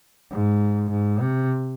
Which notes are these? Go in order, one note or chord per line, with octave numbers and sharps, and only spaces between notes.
G#2
G#2
C3